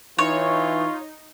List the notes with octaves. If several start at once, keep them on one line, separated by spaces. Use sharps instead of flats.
E3 D#4 F4 C#5